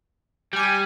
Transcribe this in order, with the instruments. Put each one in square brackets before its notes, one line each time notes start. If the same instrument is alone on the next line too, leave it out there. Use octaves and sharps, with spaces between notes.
[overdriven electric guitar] G3 [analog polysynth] G4 G#5